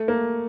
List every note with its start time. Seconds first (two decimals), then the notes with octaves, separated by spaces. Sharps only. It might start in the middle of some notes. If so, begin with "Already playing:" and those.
Already playing: A3
0.08 A#3